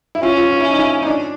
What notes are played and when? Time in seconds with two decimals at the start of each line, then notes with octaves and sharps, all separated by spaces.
0.15 E4
0.23 C#4 F4
0.37 F4
0.51 F4
0.60 E4
0.70 D#4
0.79 E4
1.02 D#4
1.07 D4